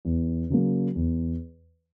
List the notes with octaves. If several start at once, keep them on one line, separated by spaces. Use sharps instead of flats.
E2
C#3 F#3 A#3
E2